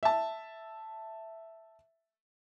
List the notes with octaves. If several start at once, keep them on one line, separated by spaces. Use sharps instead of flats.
E5 A5